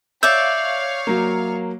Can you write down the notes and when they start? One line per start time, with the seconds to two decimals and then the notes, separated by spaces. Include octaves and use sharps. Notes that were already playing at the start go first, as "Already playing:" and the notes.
0.23 C#5 D5 E5 F5 G6
1.07 F#3 A#3